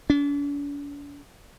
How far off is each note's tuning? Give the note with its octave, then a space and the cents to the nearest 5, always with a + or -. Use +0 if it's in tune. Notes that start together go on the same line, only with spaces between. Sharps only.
D4 -45